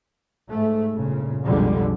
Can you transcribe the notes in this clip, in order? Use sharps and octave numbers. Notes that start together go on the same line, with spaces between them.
G#2 A3
G1 A#2 C#3
B1 F2 D3 F3 G3 G#3